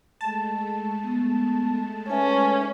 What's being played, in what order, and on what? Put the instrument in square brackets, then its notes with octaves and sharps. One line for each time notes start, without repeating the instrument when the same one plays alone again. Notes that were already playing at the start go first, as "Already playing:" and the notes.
[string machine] G#3 A3 [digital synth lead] A5
[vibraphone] B3
[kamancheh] C#4 [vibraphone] B4 E5 G#5